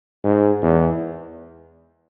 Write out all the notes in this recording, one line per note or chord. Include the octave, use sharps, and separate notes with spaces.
G#2
E2